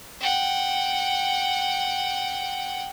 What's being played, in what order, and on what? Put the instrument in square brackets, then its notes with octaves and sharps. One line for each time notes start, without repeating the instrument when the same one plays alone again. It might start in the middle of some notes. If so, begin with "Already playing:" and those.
[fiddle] F#5 G5